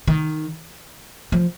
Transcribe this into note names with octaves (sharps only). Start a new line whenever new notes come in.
D#3
F3